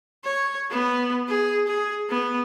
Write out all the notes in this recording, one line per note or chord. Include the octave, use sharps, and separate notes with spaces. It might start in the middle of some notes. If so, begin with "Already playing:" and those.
C#5
B3
G#4
G#4
B3